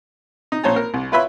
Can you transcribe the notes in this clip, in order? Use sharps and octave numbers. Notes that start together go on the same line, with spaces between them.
D#4
A#1 C#4 C5 C#5 A5 A#5
A#4
C2
E4 F4 B4 C#5 E5 B5